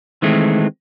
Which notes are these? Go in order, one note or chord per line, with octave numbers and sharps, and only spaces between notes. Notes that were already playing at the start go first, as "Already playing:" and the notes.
D#3 E3 G#3 A3 C4